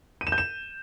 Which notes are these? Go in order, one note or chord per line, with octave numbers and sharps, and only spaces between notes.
D#7
E7
G6
E7